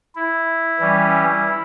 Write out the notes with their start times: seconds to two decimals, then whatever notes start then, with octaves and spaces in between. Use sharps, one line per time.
0.15 E4
0.79 E3 G3 C#4